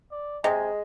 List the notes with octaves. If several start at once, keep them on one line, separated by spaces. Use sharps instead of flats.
D5
C3 G#3 D#5 G#5